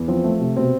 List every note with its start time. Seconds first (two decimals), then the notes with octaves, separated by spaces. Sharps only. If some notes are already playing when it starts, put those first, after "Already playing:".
Already playing: E2
0.08 F3 C4
0.24 A3
0.40 C3
0.57 B2 C4